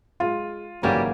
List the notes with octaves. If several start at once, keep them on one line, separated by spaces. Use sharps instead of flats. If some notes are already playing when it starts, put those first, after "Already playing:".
G#3 F4
G#1 C#3 E3 F#3 G3 A#3 G#4